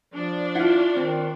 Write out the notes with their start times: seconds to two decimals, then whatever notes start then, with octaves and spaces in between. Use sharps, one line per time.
0.14 F3 D4
0.55 E4 F4 F#5
0.97 D#3 C4